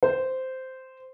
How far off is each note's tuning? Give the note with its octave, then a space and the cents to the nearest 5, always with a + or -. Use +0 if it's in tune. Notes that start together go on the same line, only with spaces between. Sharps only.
C5 -10